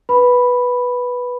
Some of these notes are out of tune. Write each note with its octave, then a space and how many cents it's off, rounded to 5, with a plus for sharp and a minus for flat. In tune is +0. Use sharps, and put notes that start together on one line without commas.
B4 -5 B5 +0